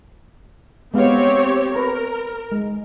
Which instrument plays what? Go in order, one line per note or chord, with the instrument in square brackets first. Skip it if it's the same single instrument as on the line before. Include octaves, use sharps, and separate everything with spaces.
[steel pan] G#3 B3 F5 [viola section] C4 G4 C#5
[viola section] A#4 [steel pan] B4 A#5
[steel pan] G#3